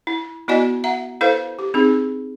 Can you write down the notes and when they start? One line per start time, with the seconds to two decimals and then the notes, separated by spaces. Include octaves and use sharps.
0.07 E4
0.48 B3 E4 F#4 D5 D#5 G#5
0.84 E5 F#5 A#5
1.21 E4 A4 B4 C5 F5
1.59 G4
1.74 C4 D#4 G#4